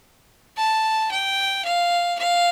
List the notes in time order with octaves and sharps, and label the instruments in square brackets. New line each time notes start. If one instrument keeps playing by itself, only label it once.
[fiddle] A5
G5
F5
F5